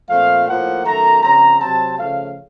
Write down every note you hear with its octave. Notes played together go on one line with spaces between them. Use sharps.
A#2 F3 A3 C4 F5
A2 F3 A#3 F#5
F#2 D#3 A3 A#5
C#3 F3 C4 A#5
C3 F#3 C4 A5
C#3 F3 A3 F5